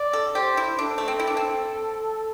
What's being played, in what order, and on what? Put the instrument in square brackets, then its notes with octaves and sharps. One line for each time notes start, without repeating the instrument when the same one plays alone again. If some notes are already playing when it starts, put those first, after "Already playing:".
Already playing: [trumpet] D5
[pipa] A4
[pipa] G4 [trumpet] C5
[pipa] E4
[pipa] D4 [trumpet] A4
[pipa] A3
C4
E4
D4
C4